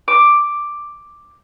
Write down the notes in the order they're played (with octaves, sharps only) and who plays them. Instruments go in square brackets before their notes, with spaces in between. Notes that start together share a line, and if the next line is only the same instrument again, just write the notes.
[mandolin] D6